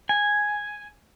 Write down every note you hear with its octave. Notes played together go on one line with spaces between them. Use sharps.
G#5